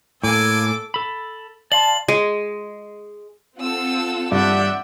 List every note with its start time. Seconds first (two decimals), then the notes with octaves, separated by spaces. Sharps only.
0.24 A2 A#3 A4 G#5 D6
0.94 A4 B5
1.72 D5 F5 A5 C6 F#7
2.08 G#3
3.59 C4 F4 A4 F#5 E6
4.32 G2 D5 E5 F#5 G6